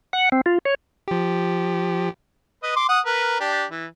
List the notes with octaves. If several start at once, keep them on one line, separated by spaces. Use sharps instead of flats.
F#5
C4
F4
C#5
F3 G4
B4 D#5
C6 D6
F#5 D#6
A#4 B4
D4 G4
E3